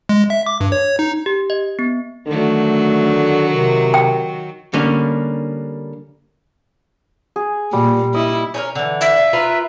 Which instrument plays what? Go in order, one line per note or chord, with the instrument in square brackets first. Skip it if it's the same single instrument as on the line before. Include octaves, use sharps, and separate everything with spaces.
[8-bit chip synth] G#3
E5
D6
G2
C#5
D#4
[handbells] G4
D#5
B3
[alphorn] D3 [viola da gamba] D#3 F#3 [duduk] A3
[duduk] C3 [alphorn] A#4
[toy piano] G5
[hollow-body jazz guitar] D3 G3 A#3 C#4
[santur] G#4
[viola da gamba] A#2 [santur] G3
[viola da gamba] E4 [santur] D#5
[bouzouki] C#4 D#4 A#4
D3 E3
[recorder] E5
[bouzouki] F4
F4 A#4 B4